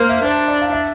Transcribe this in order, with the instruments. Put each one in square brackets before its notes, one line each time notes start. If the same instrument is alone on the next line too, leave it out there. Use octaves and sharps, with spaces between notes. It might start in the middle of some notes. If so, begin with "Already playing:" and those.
Already playing: [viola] A#3 [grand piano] A#4 C5
[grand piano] E5
[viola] D4 [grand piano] C5
[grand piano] D5
F5
E5